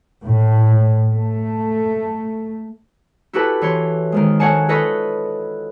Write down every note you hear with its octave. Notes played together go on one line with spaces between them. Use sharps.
A2
A3
E4 F#4 G4 A4 B4 A5
E3 C#5 C6
D#3 F3 G#3
A4 C#5 F5 F#5 G#5 A5
F4 A4 B4 D#5 B5 C#6